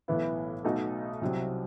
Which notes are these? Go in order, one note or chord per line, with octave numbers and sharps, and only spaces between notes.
B1 A2 E3 B3 E4
B1 B2 A3 D#4 F#4
C2 C3 F#3 C4 E4